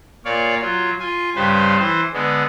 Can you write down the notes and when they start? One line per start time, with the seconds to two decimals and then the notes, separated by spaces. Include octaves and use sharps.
0.25 A#2 C#5 D5 F5
0.62 F#3 F4
1.00 F4 G#5
1.36 G2 C#3 G3 B4 C5 F5
1.80 E3 C5
2.14 D3 G#3 B3